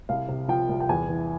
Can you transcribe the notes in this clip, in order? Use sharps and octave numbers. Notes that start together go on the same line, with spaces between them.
C2 F5
C3
F3 G5
C2
G5
E2 G#5
E3